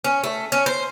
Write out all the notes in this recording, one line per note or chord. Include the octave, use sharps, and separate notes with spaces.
C#4
A3
C#4
C5